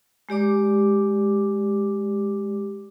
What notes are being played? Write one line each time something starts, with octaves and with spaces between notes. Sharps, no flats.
G#3 G4 D5 D6